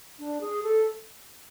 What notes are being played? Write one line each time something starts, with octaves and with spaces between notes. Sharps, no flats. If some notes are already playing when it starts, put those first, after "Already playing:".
D4
G#4
A4